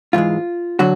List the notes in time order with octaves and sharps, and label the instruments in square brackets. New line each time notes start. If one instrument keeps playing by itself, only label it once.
[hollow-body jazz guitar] G#2 E3 G#3 F4
D3 F#3 F#4